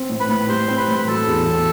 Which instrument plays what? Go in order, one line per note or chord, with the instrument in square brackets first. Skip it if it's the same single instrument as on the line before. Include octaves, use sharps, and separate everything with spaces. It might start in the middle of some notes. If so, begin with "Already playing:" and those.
Already playing: [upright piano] C4
A2
[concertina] B4 B5
[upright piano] A2
[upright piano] G3 [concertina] C5 C6
[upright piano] C4
[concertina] B4 B5
[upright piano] A2 [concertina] C6
[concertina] B5
[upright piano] F#3 [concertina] A4 A5
[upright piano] E2
E2